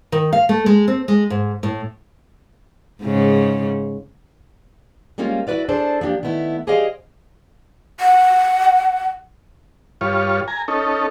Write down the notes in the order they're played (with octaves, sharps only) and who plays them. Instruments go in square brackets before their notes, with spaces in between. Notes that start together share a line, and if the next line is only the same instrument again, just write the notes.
[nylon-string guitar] D#3
F5
A3
G#3
C4
G#3
G#2
A2
[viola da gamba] G#2 C#3
[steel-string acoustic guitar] G3 G#3 A#3 C#4 F4
E4 F#4 B4 D5 F5
D4 G#4 A4 C5 D5
F3 A#3 D4 G4
D#3 A3 B3 E4
G4 G#4 C5 D5 D#5 F5
[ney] F#5
[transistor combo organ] G2 F4 C#5
G#5 A#5
C#4 D#4 A4